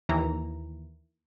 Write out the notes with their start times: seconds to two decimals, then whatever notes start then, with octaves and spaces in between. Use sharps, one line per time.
0.09 D#2 E3 A#5